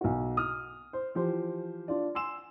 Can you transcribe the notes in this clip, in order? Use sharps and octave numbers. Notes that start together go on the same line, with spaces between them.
B1 F#4
D#6 F6
C5
E3 F3 G4 C5
D4 F4 D5
G#5 C6 E6 E7